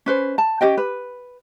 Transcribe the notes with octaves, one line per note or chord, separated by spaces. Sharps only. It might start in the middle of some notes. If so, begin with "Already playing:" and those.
C#4 B4 C5
A5
C#4 G4 D#5 G5
B4